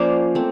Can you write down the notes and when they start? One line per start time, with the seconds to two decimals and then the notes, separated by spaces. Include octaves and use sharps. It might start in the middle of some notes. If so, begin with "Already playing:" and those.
Already playing: F3 A#3 C#4 C5 D5
0.35 A3 C4